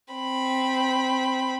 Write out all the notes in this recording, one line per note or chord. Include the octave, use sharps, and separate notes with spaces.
C4 B5